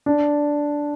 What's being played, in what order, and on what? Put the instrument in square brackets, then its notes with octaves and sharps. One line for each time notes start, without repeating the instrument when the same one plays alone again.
[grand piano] D4